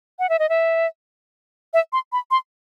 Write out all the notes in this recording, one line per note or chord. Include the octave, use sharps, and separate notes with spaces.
F#5
E5
D#5
E5
E5
C6
B5
C6